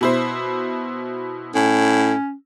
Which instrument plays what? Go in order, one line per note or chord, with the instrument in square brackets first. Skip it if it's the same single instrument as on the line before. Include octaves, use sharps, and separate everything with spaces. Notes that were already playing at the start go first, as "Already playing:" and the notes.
[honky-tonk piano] B2 E4 C5
[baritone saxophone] A2 [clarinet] C#4